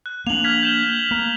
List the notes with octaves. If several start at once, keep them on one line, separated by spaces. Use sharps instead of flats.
F#6
A#3 D4 F7 F#7
F6 G#6 B6
G6 E7 G7
A#3